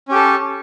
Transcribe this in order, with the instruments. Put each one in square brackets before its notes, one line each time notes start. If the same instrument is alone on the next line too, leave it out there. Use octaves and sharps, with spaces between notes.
[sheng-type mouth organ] C#4
G4
A4